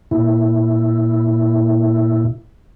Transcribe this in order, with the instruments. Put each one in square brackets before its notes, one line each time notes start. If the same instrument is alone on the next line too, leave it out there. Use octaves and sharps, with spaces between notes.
[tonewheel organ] A#2 E4